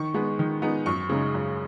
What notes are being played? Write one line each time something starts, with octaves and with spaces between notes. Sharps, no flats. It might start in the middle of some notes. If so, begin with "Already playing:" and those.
Already playing: D#3 C#6
G#3 B3 D#4
D#3
G#3 B3 D#4
F#2 C#6
C#3 G#3 D#4
F#2